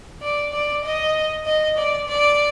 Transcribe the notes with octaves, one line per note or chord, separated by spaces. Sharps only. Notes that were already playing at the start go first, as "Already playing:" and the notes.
D5
D5
D#5
D#5
D5
D5